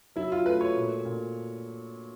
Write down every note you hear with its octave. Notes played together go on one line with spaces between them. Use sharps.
F#3 E4
F4
A3 B4
C#5
A#2
A#2